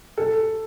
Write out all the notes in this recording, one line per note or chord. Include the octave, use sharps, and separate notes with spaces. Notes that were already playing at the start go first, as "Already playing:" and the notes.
A4